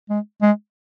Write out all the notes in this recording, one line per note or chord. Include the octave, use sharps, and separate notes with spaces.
G#3
G#3